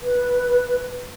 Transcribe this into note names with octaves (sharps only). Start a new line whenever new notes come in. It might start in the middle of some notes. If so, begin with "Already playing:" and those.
B4